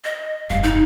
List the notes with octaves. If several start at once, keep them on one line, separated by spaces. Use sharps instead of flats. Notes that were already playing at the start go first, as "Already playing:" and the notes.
D#5
F1 G2 F5
D#4